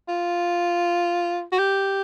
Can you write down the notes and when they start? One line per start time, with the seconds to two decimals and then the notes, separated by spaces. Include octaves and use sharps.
0.08 F4
1.52 F#4
1.58 G4